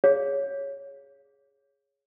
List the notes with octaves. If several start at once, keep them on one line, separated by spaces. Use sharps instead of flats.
G#4 C#5 F5